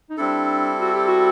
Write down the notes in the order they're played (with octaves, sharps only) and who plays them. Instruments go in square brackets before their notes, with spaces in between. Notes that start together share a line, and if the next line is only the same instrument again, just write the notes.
[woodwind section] D#4
[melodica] G3 C4 E4 A4 [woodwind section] D4
[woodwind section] F#4
G4
F#4